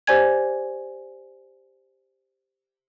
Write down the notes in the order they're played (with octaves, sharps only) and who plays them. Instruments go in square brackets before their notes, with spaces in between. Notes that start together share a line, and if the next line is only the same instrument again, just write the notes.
[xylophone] G4 C5 D5 G#5 G#6